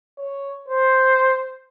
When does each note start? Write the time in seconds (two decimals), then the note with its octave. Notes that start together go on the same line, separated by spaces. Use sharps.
0.18 C#5
0.68 C5